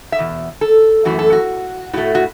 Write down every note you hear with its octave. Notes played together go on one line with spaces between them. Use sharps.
E5
E2 B2
A4
F#2 E3 A3 F#4
A4
F#4
A2 A3 F#4
F#4